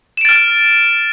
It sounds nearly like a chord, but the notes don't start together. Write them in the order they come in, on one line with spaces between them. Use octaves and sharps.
E7 D7 A6 F6